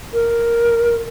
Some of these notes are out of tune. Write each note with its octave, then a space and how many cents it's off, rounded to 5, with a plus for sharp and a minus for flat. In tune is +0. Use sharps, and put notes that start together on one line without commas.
A#4 +0